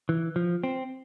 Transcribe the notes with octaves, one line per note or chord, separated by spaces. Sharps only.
E3
F3
C4